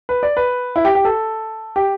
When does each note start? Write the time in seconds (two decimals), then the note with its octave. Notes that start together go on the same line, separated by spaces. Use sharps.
0.09 B4
0.23 D5
0.37 B4
0.76 E4
0.85 G4
0.95 G4
1.05 A4
1.76 G4